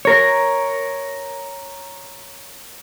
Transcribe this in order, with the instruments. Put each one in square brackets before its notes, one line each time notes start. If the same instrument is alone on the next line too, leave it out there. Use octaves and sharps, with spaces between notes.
[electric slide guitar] A#4 C#5